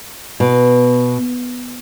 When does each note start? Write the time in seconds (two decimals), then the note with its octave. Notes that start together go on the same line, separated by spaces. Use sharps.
0.40 B2